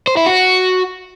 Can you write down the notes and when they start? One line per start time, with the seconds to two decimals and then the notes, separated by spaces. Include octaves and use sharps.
0.07 C5
0.17 E4
0.26 F#4